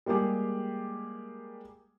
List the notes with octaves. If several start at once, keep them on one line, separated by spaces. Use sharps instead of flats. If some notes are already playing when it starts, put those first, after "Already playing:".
G3 G#3 A#3 G4 G#4